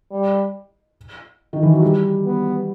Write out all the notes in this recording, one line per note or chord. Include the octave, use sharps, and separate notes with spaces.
G3
D#3
E3
F#3
G3
B3